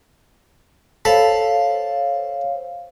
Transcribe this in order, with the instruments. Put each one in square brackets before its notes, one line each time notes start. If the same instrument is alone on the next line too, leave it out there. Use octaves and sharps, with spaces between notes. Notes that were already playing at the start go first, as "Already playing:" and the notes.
[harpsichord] A4 A5 B5 [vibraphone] C5 C#5 F5